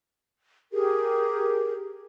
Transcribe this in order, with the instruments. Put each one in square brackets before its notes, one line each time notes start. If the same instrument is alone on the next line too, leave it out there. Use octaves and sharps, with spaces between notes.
[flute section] G4 G#4 A#4